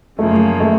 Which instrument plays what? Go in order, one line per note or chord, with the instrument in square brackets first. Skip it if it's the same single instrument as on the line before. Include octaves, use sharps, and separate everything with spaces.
[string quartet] F#2 C#3 F3 A#3 [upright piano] A3
[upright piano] A3